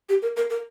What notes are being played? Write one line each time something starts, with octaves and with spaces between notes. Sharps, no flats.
G4
A#4
A#4
A#4